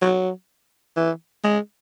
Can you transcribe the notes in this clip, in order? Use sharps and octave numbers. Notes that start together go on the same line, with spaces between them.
F#3
E3
G#3